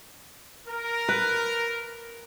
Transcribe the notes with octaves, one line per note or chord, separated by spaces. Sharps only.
A#4
B4